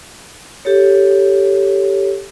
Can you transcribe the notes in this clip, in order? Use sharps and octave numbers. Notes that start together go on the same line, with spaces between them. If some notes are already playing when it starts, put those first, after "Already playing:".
G4 A4 C#5